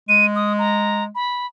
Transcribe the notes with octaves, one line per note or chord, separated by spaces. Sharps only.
G#3 D#7
D#6
A#5
B5